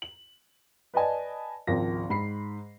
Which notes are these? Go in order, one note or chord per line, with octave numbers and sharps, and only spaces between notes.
F#7
B4 D5 D#5 G#5 A5
G#1 C#2 F3 A#4 A#6
G#2 B5 C7